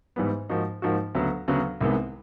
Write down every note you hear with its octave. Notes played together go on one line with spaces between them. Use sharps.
G#2 E3 G3 B3
G#2 F3 A#3 D#4 F#4
G#2 F3 A#3 D#4 F#4
D2 C#3 F#3 B3
D2 C#3 F#3 B3
C2 C3 D#3 G#3 B3